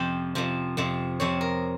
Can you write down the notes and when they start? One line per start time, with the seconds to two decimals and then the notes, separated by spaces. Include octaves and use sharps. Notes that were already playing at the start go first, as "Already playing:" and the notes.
Already playing: F2 C3 F3 G5
0.35 F2 C3 F3
0.77 F2 C3 F3
1.20 F2 C3 F3 C#5
1.41 A#4